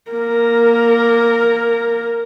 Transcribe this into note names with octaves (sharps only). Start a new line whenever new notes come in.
A#3 A#4